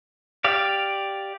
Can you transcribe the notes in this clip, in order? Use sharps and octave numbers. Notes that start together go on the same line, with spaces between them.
G4 D5 F5